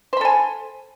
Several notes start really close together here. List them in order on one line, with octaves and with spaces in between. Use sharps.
C5 B5 A4 G#5